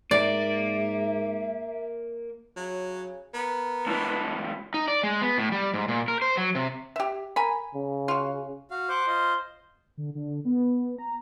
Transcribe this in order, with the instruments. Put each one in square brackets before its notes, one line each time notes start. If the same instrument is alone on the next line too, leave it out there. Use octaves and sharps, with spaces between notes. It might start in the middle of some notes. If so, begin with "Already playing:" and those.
[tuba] G#2 [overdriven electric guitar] A#3 A#4 [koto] D5 [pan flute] E5
[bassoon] C#3 [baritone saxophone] F#3
[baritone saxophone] B3 [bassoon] A#4
[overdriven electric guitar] C#2 E3 [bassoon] D4
[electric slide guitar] D#4
D5
G#3
B3
A2
G3
G#2
A#2
A#4
C5
F#3
C3
[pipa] G4 E5
A#4 G#5 B5
[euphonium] C#3
[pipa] F4 F#4
[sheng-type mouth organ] F#4 F5
[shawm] C5 [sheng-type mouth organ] F#5 D6
[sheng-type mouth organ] F4 D#5
[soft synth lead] D3
D3
B3
A#5